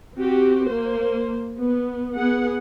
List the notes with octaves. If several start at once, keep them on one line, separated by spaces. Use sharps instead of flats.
C4 F#4 G4
A#3 C5
B3
B3 G#4 F#5